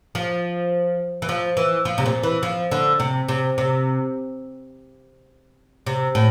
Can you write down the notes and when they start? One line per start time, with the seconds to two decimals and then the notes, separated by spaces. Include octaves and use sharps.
0.15 F3
1.22 E3
1.29 F3
1.57 E3
1.85 F3
1.98 C3
2.06 A#2
2.23 E3
2.43 F3
2.71 D3
3.00 C3
3.29 C3
3.58 C3
5.87 C3
6.15 A2